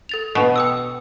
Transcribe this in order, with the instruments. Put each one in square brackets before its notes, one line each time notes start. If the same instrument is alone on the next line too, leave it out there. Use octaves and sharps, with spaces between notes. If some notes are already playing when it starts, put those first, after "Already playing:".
[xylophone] A4 A6 F7
[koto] B2
[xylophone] G5 D#6 E6